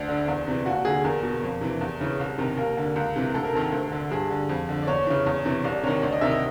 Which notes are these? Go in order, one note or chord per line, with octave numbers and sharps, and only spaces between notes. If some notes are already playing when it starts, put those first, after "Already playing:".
Already playing: D2 D4
D3
E2
C3 E3
D#2 F#4
D3 G#4
E2 A#4
B2
F2
C3 E3
E2
C#3 E3
C2
C3 D#3
D#2 A#4
D3
C#2
C3 E3
D2 A4
A#4
C3 D#3 A4
D2
D3
G2 G#4
D3
F2
D3
D5
E2 C#5
C#3 E3
E2
C3 E3
C2 D5
C3 D#3 C#5
D2 D5
D#5
C3 D#3 E5
D#5